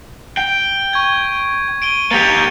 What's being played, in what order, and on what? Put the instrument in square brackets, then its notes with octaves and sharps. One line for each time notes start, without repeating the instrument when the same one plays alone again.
[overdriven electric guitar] G5
[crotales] C#6 G#6
D7 D#7 G7
[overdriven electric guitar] A#3 G4 [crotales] A6 C#7 F7